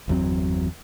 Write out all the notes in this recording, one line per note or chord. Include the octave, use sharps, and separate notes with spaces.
G1 E2 F#3 C4